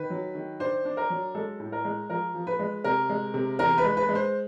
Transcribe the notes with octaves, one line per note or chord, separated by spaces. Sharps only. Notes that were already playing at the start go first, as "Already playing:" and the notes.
Already playing: D#3 B4
F#3
D#3
D4 C5
D4
A#4
F#3
G#3 A4
A2
A#4
G#3
F3 A#4
F3
B4
G#3
C3 A#4
G#3
C3
E2 A#4
B4
G#3
B4
G#3
C5